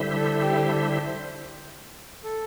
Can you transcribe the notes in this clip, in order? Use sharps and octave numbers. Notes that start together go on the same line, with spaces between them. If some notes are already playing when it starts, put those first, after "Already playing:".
Already playing: D3 G3 E4 C5 E5
A4
G4
A4
C5
A4